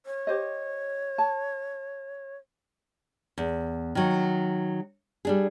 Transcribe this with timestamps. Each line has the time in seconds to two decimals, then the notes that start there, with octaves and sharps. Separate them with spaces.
0.06 C#5
0.27 G4 C5 D#5
1.18 A5
3.38 E2
3.95 D#3 F#3
5.25 G3 D4 G#4